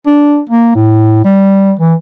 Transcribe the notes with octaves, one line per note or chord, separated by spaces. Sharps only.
D4
A#3
A2
G3
E3